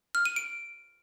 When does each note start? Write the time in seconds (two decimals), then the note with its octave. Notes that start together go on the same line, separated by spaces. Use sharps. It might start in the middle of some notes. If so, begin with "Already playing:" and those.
0.15 F6
0.25 D#7
0.36 D7